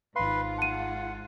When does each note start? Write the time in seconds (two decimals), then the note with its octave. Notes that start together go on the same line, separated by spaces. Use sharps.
0.16 G#1 G#2 F4 B4 F5 C6
0.58 F#5 A5 D#7